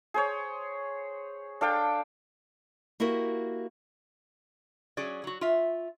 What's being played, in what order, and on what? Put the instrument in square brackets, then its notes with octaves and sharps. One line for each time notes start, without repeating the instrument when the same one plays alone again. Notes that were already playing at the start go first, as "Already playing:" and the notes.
[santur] G#4 C5 C#5
D4 A4 F5 G5
[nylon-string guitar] A#3 E4 F#4 G4 A#4
[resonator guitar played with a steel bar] F#3 C#4 G#4 D5
F#3 F#4
F4 E5